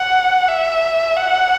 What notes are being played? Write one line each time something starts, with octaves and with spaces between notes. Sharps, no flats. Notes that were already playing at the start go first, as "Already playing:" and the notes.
Already playing: F#5
E5
F#5